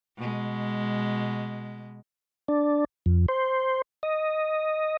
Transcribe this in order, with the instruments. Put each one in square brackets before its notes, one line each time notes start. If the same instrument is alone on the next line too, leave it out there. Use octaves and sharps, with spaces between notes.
[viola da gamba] B2 G#3
[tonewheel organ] D4
F2
C5
D#5